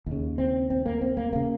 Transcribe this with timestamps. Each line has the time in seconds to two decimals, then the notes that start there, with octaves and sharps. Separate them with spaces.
0.06 D#2 C#3
0.38 C4
0.70 C4
0.86 A#3
1.01 C4
1.17 A#3
1.33 C#3 A#3